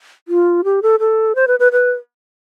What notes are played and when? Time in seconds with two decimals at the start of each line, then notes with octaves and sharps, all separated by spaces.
0.28 F4
0.64 G4
0.83 A4
1.00 A4
1.35 C5
1.48 B4
1.60 B4
1.72 B4